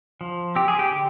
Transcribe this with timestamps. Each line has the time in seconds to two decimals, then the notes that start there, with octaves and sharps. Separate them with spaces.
0.21 F3
0.56 C4 G4
0.68 G#4
0.79 G4
0.91 D3